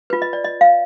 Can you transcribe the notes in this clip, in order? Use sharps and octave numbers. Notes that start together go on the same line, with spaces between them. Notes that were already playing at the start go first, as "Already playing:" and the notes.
F4 B4
D#5
D5
D#5
F5